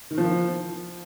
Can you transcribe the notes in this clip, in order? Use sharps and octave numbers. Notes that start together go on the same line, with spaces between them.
D#3
F3